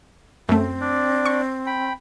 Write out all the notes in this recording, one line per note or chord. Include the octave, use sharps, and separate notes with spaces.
F#2 A3 C4
D4 D5
C#6
G5 B5